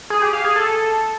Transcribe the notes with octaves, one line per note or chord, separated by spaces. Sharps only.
G#4
G4
F5
G#4
A4